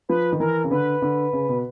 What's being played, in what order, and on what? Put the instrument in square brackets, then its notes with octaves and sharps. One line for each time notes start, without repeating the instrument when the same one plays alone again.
[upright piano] F3 [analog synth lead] B4
[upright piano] D#3
[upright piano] E3 [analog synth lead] A#4
[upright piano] C#3
[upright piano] D3 [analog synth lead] B4
[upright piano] D3
C#3
B2